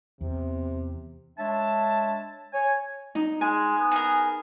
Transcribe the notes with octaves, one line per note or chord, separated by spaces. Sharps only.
E2 C3
G#3 D4 C#5 E5 A5
C#5 G#5
D#4
G#3 G#5
B3
G#4 A#4